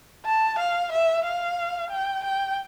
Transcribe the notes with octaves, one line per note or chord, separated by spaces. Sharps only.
A5
F5
E5
F5
G5
G5